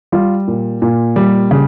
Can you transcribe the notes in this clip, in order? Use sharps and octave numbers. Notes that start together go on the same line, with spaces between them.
G3 F4
A#2
A#2
G3
C#3